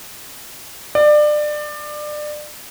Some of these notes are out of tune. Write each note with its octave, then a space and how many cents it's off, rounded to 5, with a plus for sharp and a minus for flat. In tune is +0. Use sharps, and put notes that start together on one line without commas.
D5 +25